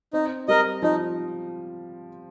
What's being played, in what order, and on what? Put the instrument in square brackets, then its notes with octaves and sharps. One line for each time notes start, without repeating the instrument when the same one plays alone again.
[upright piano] C4 [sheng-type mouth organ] D#4
[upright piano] G3 [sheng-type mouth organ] A#4 D#5
[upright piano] F3 [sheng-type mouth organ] D#4